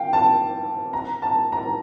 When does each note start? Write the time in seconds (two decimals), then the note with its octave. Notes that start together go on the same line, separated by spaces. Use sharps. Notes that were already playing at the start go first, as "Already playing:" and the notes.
Already playing: F5 G5
0.13 A5
0.93 A#5
1.22 A5
1.52 A#5